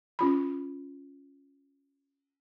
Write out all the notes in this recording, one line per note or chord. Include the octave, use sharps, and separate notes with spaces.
C#4 F4 B5